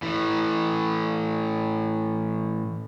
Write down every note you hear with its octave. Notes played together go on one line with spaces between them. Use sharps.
A2 E3